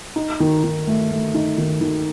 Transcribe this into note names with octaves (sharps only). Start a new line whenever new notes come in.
D#4
D#3
D#3
A3
A3
D#4
D#3
D#3